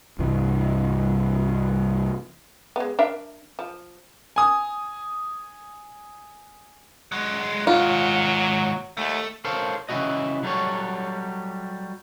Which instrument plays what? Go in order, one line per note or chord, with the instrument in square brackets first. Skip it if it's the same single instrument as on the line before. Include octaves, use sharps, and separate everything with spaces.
[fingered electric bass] C2 G2 E3
[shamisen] G#3 B3
D4 A#4 E5
F3
[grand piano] G#5 D#6
[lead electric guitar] F#3 G#3
[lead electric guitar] D#2 G#2 [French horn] F#3 [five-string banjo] F4
[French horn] D#2 [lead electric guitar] A3
[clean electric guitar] A4 A#4 C5 C#5 F5 A5
C#3 E3 A3 E4 F#4 D#5
F#3 G3 A4 C#5